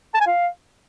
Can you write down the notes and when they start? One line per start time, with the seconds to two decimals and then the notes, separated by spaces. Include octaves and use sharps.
0.14 A5
0.21 G#5
0.27 F5